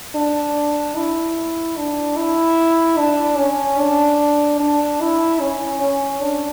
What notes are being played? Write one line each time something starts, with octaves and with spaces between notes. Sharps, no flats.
D4
E4
D4
E4
D4
C#4
D4
D4
E4
C#4
C#4
D4